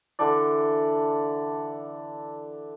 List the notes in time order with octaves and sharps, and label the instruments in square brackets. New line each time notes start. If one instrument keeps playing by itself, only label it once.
[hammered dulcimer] D3 E3 A4 D5